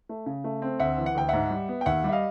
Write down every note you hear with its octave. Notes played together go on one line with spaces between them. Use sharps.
A3
C#3
A3
C4
D2 E5 F#5
E3
F#5
D2 G5
G#2 E5 F#5
G3
B3
G5
D#2 E5 F#5
G3 E5
D#5 F5